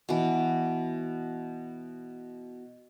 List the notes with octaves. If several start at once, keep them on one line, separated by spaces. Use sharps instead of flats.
B2 E3